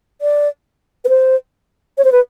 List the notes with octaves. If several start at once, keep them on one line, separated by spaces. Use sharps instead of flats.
D5
B4
C5
C#5
C5
B4